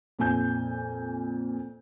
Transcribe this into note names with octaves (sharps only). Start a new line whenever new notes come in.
F2 A#2 G#5 G6